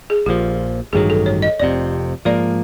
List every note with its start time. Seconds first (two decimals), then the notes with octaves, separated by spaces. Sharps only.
0.10 G#4
0.26 A#1 A#2 F3 G4
0.93 A1 G2 D#3 F#3 G#4
1.10 A4
1.26 C#5
1.42 D#5
1.60 F1 F2 C3 D5
2.25 G#2 F3 A#3 D5